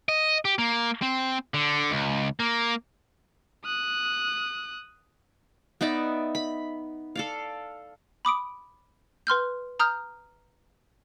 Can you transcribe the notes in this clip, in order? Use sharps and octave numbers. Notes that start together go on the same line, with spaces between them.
D#5
G4
A#3
C4
D3
C#2
A#3
D#6 F#6
B3 D#4 D5 E5
B5
A4 D5 F5
B5 D6 D#6 D7
B4 C6 F6 G6
A#5 D#6 F6 G6